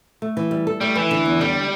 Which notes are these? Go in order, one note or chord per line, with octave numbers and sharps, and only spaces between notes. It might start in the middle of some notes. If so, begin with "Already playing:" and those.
A3
E3
G3
A4
G3 A3
E3 B4
D3
E2
D3 G3